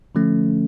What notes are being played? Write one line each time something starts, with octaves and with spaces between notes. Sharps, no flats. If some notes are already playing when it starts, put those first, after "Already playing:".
D3 F3 A3 C#4